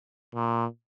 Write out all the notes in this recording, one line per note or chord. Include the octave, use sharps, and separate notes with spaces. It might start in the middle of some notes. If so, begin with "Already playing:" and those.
A#2